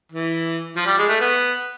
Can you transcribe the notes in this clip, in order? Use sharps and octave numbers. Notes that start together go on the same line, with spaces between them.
E3
F3
G3
G#3
A3
B3